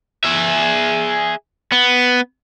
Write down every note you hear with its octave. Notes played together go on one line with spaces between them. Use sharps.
G#4 E5
B3